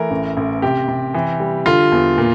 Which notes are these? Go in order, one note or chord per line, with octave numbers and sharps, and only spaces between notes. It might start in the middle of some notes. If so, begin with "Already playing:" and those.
Already playing: E3 A3 A#4
A1
A1
C3 G4
C3
E3
G3
D3 F4
E2
A#2